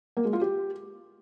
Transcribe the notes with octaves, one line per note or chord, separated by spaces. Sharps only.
A#3
G#3
F4
G4